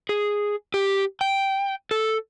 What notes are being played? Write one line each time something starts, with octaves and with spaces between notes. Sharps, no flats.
G#4
G4
G5
A4